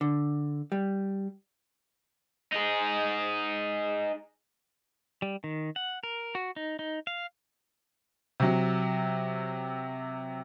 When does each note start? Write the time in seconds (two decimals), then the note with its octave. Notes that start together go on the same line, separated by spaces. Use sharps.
0.01 D3
0.72 G3
2.52 D#4 G#4
5.22 G3
5.44 D#3
5.76 F#5
6.03 A#4
6.35 F#4
6.56 D#4
6.79 D#4
7.07 F5
8.40 C3 F#3